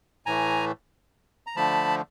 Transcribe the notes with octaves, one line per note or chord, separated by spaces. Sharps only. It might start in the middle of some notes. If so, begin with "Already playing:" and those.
A2 E3 A3 G#5 A#5
A#5
D3 F3 A3 A5 B5